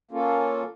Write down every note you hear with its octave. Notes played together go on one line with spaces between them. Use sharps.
A#3 C#4 F4 A4